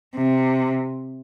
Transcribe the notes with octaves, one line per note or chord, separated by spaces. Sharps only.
C3